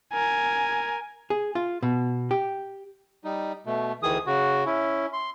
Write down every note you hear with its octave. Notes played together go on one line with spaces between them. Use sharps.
A#4 G#5
G#4
F4
B2
G4
G3 D#4
B2 A3
D2 D#3 E3 G#4 D#6
C#3 F#4
C#4 E4
C6